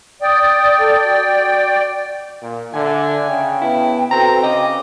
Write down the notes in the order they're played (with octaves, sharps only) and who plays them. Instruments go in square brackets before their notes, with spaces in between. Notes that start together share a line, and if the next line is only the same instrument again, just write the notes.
[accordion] D5 G5 [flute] D#6
[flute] A4
F#4
[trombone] A#2
[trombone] D3 [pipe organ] E5 [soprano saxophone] G#5
[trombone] C#3 [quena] G5
[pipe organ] B3 B4 A5 [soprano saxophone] E4
[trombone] C4 [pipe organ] F#4 A4 B4 [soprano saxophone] A#5
[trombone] C#3 [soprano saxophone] D#5 [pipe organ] G#5 D6